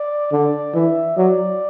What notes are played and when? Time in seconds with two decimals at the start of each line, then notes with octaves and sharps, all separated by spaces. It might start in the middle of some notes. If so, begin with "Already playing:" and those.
Already playing: D5
0.32 D3 D5
0.74 E3 E5
1.17 F#3 D5